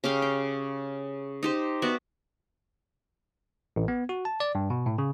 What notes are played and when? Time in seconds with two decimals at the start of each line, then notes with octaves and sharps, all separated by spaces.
0.04 C#3 G4 F5 G5
0.22 G5
1.43 D#4 G4 C5
1.82 B3 F#4 D5 E5
3.76 A1
3.88 B3
4.09 F#4
4.25 A5
4.40 D5
4.55 G2
4.70 B2
4.86 A2
4.98 C#3